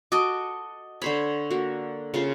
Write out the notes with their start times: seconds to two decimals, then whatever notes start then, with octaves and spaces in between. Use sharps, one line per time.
0.12 F#4 A4 D#5 D6
1.02 D3 C5 C#5 B5
1.51 A#3 F#4
2.14 C#3 F4 C5